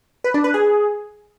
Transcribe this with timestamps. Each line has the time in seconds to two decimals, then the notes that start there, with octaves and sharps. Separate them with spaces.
0.24 B4
0.34 D4
0.44 B4
0.54 G#4